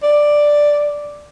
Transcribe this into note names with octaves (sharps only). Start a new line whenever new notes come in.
D5